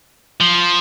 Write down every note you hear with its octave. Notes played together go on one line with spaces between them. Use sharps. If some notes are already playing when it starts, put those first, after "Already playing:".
F3